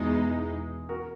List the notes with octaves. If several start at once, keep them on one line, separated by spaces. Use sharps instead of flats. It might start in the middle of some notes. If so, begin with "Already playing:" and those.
Already playing: E2 B2 G#3 D#4 E4 G#4
F#4 A#4